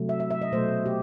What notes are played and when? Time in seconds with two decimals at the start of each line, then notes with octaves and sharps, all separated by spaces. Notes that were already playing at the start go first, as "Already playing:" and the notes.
Already playing: C3 F#3 A3
0.09 E5
0.20 E5
0.30 E5
0.42 D#5
0.52 B2 F#3 A3 C5
0.86 G4